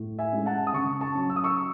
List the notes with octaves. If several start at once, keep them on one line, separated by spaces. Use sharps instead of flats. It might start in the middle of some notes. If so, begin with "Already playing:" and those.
Already playing: A2
E5 G#5
G#3 C#4
F#5 A5
D#6
C#3 A5 C#6
A5 C#6
F#3 C#4
E6
D#6
C#6 E6